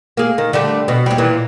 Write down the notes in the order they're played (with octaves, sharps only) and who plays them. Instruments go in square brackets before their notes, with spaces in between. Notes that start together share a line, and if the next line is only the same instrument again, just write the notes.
[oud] A#3 G#4
D#3
D3 G3 A3
B2
D#2 G3
A#2 E3